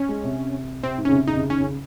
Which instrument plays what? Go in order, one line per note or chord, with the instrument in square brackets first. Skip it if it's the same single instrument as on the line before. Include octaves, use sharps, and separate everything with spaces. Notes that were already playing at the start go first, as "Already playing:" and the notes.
Already playing: [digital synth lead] C#4
[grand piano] G#3
C3
[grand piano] C3 [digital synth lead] C4
[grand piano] G#2
[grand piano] C#3 [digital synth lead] C#4
[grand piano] C3
[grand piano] C#3 [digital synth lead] D#4
[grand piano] C3
C#3
[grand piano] D#3 [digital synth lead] C#4
[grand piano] C#3